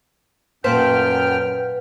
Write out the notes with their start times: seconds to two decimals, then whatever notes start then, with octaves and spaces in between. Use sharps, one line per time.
0.64 F#2 A#2 B4 C5 F#5 G5 A5 F6